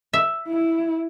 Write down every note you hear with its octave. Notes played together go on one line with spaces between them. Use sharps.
E5
E4